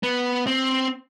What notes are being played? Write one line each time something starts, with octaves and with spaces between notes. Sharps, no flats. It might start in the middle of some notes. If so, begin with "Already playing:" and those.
B3
C4